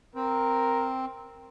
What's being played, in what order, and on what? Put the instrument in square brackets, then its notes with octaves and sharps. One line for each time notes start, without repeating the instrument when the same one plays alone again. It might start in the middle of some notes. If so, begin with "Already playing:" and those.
[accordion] C4 [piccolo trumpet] A#4